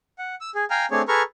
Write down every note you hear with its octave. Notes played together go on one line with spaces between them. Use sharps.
F#5
E6
G#4
F5 G5 G#5 A#5 F6
A3 C4 D4 G#4 C#5
G#4 A4 B4 A#5 C#6 F6